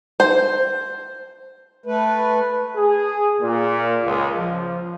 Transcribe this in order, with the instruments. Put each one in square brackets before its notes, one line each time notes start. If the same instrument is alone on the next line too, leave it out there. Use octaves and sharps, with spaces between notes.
[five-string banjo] C5
[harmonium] A3 B4
[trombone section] G#4
A#2
C#2
F3